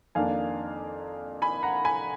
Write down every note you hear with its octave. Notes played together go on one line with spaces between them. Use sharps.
F2 D#3 A#3 D4 F5 G#5
G#5 B5
F#5 A#5
G#5 B5